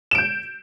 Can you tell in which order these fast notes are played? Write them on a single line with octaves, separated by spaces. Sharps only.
E7 D7 G6